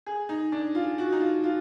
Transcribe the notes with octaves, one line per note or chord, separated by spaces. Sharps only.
G#4
D#4
D4
F4
F#4
D#4
F4
F4